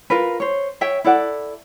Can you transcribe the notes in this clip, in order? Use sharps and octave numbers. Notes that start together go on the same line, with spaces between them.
F4 A#4 B4
C5 C#5
C#5 E5 G5
E4 A4 D5 F#5